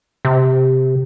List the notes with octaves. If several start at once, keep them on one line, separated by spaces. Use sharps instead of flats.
C3